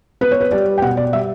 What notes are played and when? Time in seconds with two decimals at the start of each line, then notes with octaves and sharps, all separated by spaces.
0.21 B3 B4
0.31 C#5
0.41 B4
0.51 G3 D5
0.78 G5
0.82 B2 F#5
0.97 D5
1.13 G3 E5